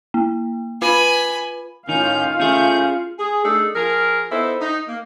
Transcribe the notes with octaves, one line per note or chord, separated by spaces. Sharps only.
A#3
F4 B4 G#5 B5
A2 D#3 C#4 D#4 F4 F5 G6
A3 C#4 G#4 G6
G#4
A3 D4 D#4 G#4 A4
F3 G#4 A#4
B3 D#4 E4 A4 C5
D#4
A#3